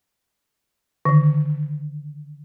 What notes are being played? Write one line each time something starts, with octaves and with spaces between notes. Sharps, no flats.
D3 D#3